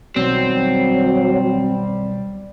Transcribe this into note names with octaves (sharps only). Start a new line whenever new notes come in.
B1 B2 D#3 F#3 G3 C4